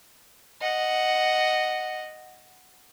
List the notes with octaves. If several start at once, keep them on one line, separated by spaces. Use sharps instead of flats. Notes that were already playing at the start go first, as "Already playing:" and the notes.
D#5 F#5